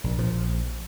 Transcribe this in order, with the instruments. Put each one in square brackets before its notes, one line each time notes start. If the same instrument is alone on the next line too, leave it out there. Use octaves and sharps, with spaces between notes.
[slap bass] A#1
A#1 A#2 F3